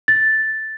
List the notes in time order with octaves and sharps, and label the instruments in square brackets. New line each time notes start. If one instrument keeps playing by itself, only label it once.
[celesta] A6